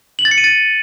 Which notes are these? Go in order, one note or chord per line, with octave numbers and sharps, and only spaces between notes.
F#7
A6
C#7
D#7
A6